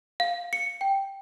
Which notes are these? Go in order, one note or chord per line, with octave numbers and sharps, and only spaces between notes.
F5
C#7
G5